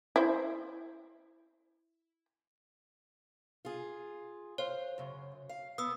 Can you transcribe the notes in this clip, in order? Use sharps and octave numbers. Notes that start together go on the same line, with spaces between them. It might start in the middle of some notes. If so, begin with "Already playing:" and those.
E4 C5
F4 G#4
C5 C#5 F5
F#2 C#3
F5
B3 D#6 E6